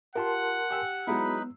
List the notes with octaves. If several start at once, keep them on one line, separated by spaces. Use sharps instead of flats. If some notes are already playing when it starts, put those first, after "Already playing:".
F4 G4 A#4 F#5 A5 C6
G4 G#5 E6
F#3 G#3 B3 D#4 E4 B4 B5